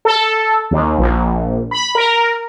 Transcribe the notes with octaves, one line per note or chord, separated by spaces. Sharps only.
A4
D#2
A#1
B5
A#4